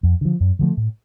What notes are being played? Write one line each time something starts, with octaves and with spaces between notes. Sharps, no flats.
F2
D3 F3
F#2
D3 F3 A3
A2